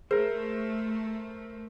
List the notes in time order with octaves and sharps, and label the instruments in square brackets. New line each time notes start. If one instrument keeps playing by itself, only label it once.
[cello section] A3 [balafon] G#4 [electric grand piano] A#4 C5